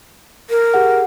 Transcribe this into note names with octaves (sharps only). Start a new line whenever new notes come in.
A#4
G4 G#4 F#5